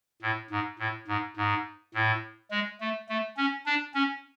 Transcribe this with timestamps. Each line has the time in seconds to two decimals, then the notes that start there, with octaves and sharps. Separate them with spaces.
0.22 A2
0.51 G#2
0.79 A2
1.08 G#2
1.37 G#2
1.94 A2
2.51 G#3
2.80 A3
3.09 A3
3.37 C#4
3.66 D4
3.94 C#4